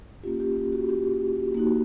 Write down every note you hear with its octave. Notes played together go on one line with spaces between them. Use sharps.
A#3 C#4 F4 G4
G4
G4
F#4
G4
A#3 D#4 F#4